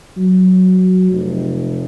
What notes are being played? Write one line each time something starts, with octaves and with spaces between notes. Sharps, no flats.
F#3
F1